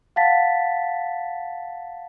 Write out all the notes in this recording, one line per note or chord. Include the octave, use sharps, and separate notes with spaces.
F5 F#5 A5 A6 B6